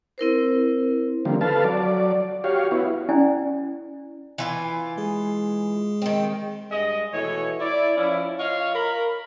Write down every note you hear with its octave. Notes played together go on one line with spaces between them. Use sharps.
C4 E4 A#4 C5
D3 F3 G3 A#3 C4
A4 B4 F5 A5
F#3 D5
F#4 G4 C#5 F5
B3 E4 F#4
C#4 E4 D5 G#5
E3 F4 G#5
G#3 G#4
D#3 C4
G2 G#3 D#5
B2 E3 A3 C#5
E4 D5
F3 C#4 E4
F4 C#5 D#5 F5
A#4 B5